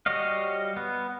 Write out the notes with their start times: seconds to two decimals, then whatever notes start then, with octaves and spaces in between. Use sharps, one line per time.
0.06 G3 F#4 C#5 D#5 F5
0.77 B3